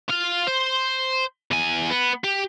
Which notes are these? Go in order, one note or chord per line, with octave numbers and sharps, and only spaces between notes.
F4 F5
C5
E2 G#5
B3
G4